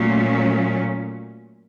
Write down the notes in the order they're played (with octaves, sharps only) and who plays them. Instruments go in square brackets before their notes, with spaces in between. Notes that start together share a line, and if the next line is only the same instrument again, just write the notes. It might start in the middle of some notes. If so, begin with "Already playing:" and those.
Already playing: [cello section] A#2 F#3 A3 C#4